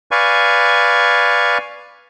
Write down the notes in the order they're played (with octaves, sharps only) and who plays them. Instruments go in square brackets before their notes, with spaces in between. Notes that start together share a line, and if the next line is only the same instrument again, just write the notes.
[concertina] B4 D5 F5 G#5 C#6